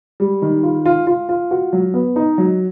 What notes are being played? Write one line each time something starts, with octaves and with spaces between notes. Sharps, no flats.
G3
D#3
F4
F4
F4
F4
F#4
F#3
B3
D#4
F#3